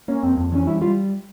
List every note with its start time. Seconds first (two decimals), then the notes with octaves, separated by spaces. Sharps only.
0.08 A#3 C#4
0.23 F2 C4
0.37 F2
0.52 E3 C#4
0.67 G3 E4
0.81 G3 F4